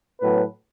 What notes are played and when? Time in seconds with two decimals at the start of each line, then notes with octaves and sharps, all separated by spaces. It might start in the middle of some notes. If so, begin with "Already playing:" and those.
0.21 A2 F#3 B3 B4